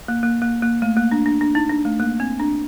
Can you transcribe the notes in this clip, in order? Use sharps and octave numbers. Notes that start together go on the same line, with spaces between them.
A#3
A#3
A#3
A#3
A3
A#3
D4
D4
D4
D#4
D4
A3
A#3
C4
D4